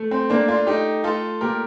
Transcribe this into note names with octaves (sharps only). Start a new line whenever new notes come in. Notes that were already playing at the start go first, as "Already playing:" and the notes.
Already playing: A3
C4
A3 A#3 D4
D4 F4
A3 D#4 G4
A3 F4 A4
A#2 G4 A#4